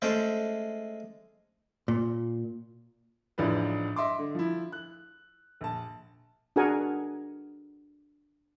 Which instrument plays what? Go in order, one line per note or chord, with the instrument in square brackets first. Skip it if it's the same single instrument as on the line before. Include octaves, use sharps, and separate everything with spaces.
[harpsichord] G#3 A3 C#4 C5 D5 E5
[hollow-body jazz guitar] A#2
[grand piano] A1 G#2 F3 D4 E4 B4
D#5 E5 C6 D6
D3
F3 E4
F#6
A#1 A5
[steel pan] D4 F#4 G#4 A#4 F#5 G#5